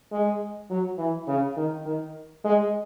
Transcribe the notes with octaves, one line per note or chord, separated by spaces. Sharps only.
G#3
F#3
E3
C#3
D#3
D#3
G#3